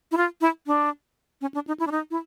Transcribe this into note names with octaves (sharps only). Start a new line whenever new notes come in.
E4
F4
E4
D4
C#4
D4
D#4
E4
D4
D#4
E4